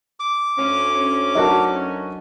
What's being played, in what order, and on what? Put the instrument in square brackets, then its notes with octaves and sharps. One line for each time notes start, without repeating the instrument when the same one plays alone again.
[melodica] D6
[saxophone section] D2 C#4 [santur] C6
[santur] F#3 D4 [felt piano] D#4 F#4 A#4